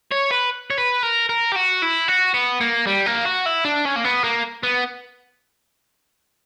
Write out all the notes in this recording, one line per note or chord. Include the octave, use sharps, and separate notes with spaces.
C#5
B4
C#5
B4
A#4
A#4
G4
F#4
E4
F#4
B3
A#3
G3
A#3
F#4
E4
D4
C#4
A#3
B3
A#3
B3